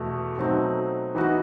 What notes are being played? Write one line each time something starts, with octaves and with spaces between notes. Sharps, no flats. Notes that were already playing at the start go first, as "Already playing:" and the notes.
Already playing: E2 B2 A3
B2 F#3 A3 C4 D#4
E3 B3 D#4 F#4